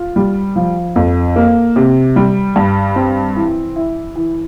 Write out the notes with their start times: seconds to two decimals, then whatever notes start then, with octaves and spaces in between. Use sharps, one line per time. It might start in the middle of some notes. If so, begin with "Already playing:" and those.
Already playing: F4
0.16 G3
0.56 F3
0.96 F2
1.36 A#3
1.76 C3
2.16 G3
2.56 G2
2.96 C4
3.36 E3
3.76 E4
4.15 E3